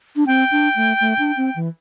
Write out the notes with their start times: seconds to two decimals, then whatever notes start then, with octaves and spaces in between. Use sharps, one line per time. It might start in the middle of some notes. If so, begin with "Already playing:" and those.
0.16 D4
0.27 C4 G5
0.52 D4
0.76 A3
1.01 A3
1.19 D4
1.37 C4
1.56 E3